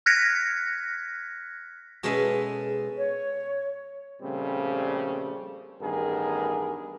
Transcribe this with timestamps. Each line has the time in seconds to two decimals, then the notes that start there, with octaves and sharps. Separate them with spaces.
0.06 F6 F#6 G#6 A#6 B6 C#7
2.03 B2 G#3 C#4 A4 E5 G#5
2.97 C#5
4.22 A#2 C#3 F3 G3 A3 C4
5.81 A1 G2 D#3 B3 G#4 A#4